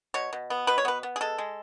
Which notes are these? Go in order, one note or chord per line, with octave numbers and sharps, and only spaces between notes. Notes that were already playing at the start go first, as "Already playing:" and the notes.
B2 C#5
B2
B3
B2 B4
C#5
B3 B4
B3
G#4
G#3 A4
G#3